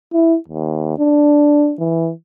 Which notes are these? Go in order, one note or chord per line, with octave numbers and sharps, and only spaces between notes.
E4
D#2
D4
E3